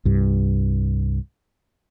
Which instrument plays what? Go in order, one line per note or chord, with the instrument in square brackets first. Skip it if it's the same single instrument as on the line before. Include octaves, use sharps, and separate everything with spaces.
[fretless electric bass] C2 G2